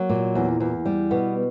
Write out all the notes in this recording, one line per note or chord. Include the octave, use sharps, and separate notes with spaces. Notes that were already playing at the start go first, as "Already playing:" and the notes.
Already playing: F#3 A#3
A#2
E2
E2
G3
B2 B3